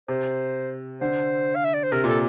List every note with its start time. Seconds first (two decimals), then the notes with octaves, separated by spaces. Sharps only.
0.08 C3 C5
1.01 D3 C5
1.55 F5
1.64 E5
1.74 D5
1.83 C5
1.92 C3 A#4
2.04 A#2 A4